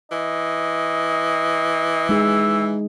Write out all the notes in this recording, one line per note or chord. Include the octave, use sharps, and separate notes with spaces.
E3 D#5
G#3 D#4 G#4 E6